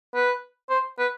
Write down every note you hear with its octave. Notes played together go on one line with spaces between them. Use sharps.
B4
C5
B4